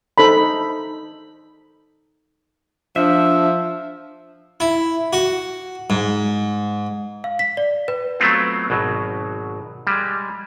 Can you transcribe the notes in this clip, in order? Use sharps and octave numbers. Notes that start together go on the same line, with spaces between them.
D#4 A4 C5 B5
F3 D4 E5
E4
F#4
G#2
F5
B6
D5
B4
F#3 A3 B3 C4 F4
G#1 B2 F#3
G3 G#3